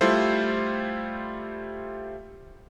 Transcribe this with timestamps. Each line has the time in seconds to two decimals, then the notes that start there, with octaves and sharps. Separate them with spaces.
0.01 G3 A3 E4 F4 A4 C5